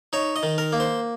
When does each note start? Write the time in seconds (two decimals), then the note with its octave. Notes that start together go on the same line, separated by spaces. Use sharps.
0.13 D#4 C#5
0.36 D#5
0.43 D#3
0.58 A#4
0.73 A#3
0.80 C5